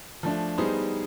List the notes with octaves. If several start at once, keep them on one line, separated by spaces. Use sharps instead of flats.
F3 A3 D4
G3 B3 D#4 G#4 C5